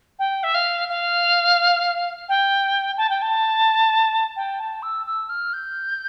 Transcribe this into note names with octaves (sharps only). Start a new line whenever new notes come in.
G5
E5
F5
F5
G5
A5
G5
A5
G5
A5
E6
E6
F6
G6